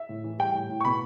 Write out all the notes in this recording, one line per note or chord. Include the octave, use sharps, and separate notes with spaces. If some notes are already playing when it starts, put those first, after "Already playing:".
Already playing: E5
A2
E3
G3 G5
A2
A2
C#6
B2 B5